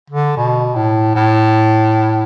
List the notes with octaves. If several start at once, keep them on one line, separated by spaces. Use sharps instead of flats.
D3
B2
A2
A2